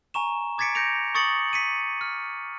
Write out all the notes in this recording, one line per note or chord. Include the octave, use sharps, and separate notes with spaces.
G#5 A#5 C#6 E7
D6 G#6 A6 B6 C#7 D7
G6 A#6 C#7 D7 F7
C#6 D#6 A6 C#7 F#7
B6 C#7 D#7
F6